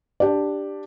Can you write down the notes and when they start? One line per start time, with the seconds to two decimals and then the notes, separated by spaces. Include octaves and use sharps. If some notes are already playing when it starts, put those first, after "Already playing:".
0.20 D4 G4 D5